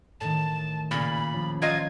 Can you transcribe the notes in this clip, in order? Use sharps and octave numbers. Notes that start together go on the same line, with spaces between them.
A2 D#3 A5
A#2 C#3 B5
F3 C#4
F#3 F4 D#5 G#6